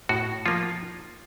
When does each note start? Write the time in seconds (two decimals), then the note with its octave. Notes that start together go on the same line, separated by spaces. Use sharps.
0.09 A2 F#4
0.46 F3 A#3 F4